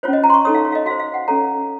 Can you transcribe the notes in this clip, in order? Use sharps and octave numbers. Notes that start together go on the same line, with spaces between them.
C#4 F4 C5 C#5
D#5
A#5
C6
C#6
D#4 A4 C#5 D#6
F5
C#5
F5
D#5
F#4 C5 F5
F5
F#5
C#4 A4 C#5 A#5